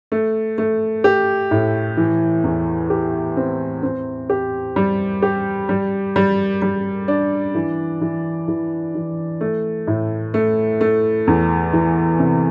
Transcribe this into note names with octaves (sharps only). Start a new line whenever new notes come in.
A3
A3
G4
A2
E3
E2
G4
C4
C4
G4
G3
G4
G3
G3
G3
D4
E3
E3
E3
E3
A3
A2
A3
A3
E2
E3
C3